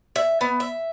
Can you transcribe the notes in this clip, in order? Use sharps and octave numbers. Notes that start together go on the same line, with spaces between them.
E5
B3
E5